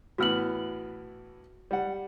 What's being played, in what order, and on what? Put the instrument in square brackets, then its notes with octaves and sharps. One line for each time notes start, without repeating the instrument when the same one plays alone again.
[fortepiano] A2 E3 B3 [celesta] F#4 F6 F#7
[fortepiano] G3 F#5